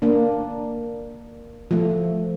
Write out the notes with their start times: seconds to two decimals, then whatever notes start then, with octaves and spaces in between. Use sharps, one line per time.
0.02 A#3 D4
1.71 F3 A3